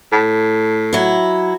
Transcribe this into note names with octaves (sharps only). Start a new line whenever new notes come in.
A2
F#3 E4